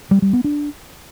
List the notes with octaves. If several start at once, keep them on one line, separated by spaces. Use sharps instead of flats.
G3
G3
B3
D4